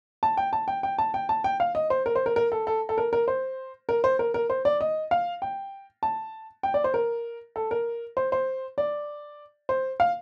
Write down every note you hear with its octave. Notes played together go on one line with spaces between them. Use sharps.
A5
G5
A5
G5
G5
A5
G5
A5
G5
F5
D#5
C5
A#4
C5
A#4
A#4
A4
A4
A4
A#4
A#4
C5
A#4
C5
A#4
A#4
C5
D5
D#5
F5
G5
A5
G5
D5
C5
A#4
A4
A#4
C5
C5
D5
C5
F5